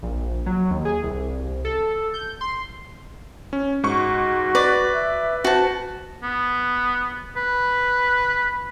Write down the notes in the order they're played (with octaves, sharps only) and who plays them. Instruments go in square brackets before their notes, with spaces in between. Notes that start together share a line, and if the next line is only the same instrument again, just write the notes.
[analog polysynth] A#1
F#3
D#2
G#4
C2
A4
G6
C6
[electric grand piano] C#4
[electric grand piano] G#2 C#6 [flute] F#4
[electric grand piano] B4 [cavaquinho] D5
[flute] E5
[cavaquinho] F#4 A5 [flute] C5
[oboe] B3
B4